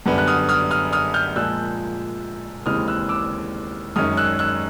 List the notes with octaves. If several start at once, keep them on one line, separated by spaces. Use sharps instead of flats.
F#2 D3 G3 B3
F#6
D#6 F6
D#6 F6
D#6 F6
D#6 F6
F6 G6
A#2 F3 G#3 E6 F#6
D#2 C#3 E3 G#3 C4 D#6 F6
E6 F#6
D6 E6
F#2 D#3 G#3 C#4 D#6 F6
E6 F#6
E6 F#6